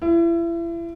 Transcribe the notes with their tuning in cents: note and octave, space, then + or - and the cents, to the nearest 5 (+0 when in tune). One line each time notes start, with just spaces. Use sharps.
E4 +35